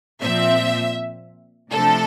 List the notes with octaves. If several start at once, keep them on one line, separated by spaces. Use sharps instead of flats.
A#2 F3 C4 E5
C3 F3 A3 D4 A4